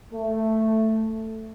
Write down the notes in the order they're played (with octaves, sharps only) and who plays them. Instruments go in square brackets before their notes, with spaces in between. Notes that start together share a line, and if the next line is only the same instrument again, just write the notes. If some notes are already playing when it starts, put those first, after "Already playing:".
[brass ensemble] A3